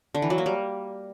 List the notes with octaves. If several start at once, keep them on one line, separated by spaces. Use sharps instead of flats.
D3
E3
F#3
A#3
G3